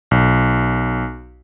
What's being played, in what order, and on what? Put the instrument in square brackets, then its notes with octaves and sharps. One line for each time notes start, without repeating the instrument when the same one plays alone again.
[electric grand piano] B1